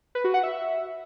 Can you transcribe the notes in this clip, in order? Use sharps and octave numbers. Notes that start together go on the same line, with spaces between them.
B4
F#4
F#5
E5